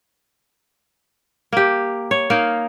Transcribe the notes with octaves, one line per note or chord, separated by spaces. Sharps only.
A#3 G4
C#5
A#3 D#4 F5